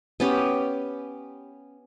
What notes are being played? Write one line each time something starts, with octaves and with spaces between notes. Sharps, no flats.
B3 C#4 G4